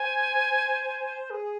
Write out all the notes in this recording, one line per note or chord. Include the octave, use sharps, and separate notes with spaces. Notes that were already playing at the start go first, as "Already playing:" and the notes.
Already playing: C5 G#5
G#4